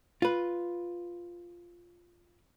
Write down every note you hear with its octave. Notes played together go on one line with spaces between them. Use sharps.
F4 B4